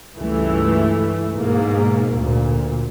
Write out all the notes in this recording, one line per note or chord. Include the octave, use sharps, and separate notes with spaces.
C#2 G2 E3 A3
G#2 B2 A#3
D2 A#2